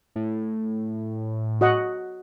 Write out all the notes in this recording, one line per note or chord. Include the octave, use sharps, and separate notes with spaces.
A2
F#4 D#5 F#5